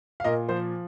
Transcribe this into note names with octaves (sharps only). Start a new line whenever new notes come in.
F5
A#2 A#4 D#5
F3 C5